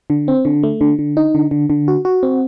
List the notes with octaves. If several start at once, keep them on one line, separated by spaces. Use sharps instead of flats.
D3
C4
D3
A3
D3
D3
D#4
D3
D3
D3
F#4
F#4
C4